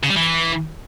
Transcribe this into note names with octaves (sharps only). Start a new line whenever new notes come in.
C#3
G3
E3